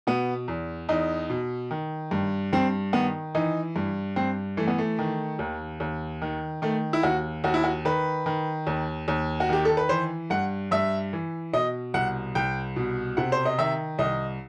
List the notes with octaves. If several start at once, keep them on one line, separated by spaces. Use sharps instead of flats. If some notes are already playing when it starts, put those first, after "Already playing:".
B2 B3
E2
E2 D#4
B2
D#3
G2
G2 C4
D#3 B3
E3 D#4
G2
G2 C4
E3 A3
B3
A3
D#3
D#2
D#2
D#3
D#3 A3
E4
D#2 F#4
D#2 F#4
E4
F#4
D#3 B4
D#3
D#2
D#2
F#4
D#3 G4
A4
B4
E3 C5
G2 F#5
G2 E5
E3
B2 D#5
C2 F#5
C2 G5
B2
C3 F#5
C5
D#5
D#3 E5
C2 D#5